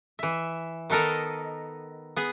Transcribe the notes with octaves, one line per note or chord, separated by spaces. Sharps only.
E3 E5
D#3 B3 A4 A#4 D#5
B3 G#4